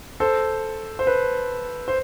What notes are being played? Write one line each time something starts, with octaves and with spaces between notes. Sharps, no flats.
A4 C5
C5
B4
C5